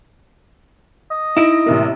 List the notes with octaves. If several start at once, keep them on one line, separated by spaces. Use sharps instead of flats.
D#5
D#4 E4 A#6 D7
A1 C3 A#3